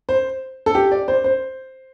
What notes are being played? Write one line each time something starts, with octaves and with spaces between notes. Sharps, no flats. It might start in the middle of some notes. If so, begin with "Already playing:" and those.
C5
A4
G4
D5
C5
C5